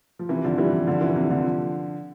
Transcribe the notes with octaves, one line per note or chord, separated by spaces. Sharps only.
F3
C3 E3
D3 F3
E3 G3
D3 F3
C3 E3
C3 E3
D3 F3